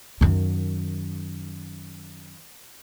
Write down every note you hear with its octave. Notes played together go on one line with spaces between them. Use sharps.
F#2 D#3